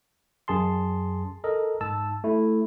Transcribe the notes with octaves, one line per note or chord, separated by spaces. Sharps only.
F#2 G#4 A5 C6
A4 A#4 D#5
G#2 A5 E6
A3 E4